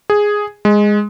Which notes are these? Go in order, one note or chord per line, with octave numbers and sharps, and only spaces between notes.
G#4
G#3